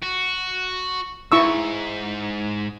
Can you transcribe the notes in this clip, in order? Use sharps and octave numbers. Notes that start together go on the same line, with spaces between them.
F#4
G#2 E4 C#6 E6